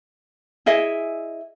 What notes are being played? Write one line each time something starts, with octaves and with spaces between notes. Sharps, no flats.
E4 G#4 D#5 E5